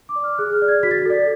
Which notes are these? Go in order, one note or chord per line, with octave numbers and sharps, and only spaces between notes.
D6
D5
F6
G#4 F#6
F6
D5
G#6
F#4 B6
A6
B6
A4 D5